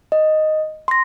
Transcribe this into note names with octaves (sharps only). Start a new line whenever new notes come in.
D#5
C6 A#6